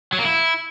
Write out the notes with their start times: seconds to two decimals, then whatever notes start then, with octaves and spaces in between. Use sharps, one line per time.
0.13 F#3
0.19 A#3
0.25 E4